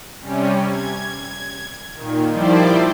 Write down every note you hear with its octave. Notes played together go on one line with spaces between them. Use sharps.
C3 G3 C#4
G#6
A#2 D#3
D#3 F3 G3 E4 C5 D5